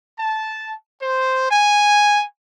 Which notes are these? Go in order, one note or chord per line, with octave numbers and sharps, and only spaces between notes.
A5
C5
G#5